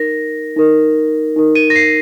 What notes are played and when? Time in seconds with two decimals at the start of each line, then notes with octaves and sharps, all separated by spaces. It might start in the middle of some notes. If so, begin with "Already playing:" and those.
Already playing: D#4 A#4 A#6
0.56 D#4 A#4
1.36 D#4 A#4
1.55 D#7
1.70 A#6
1.76 C7